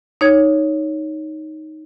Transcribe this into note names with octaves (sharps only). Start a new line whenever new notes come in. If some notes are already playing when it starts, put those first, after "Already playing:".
D#4 C#5 G#6